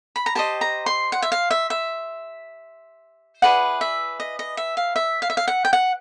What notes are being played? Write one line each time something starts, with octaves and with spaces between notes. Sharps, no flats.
B5
A#5
G4 C5 D#5 A5
A#5
C6
F#5
E5
F5
E5
E5
E4 G#4 B4 D5 F#5
E5
D#5
D#5
E5
F5
E5
F5
E5
F5
F#5
G5
F#5